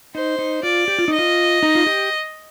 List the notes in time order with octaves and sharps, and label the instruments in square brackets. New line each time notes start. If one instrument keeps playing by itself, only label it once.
[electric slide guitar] D#4 [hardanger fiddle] C5
[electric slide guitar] D#4
[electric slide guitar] F4 [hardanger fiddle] D5
[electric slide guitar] G4
F4
D#4
[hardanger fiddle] D#5
[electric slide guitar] F4
D#4
F4
G4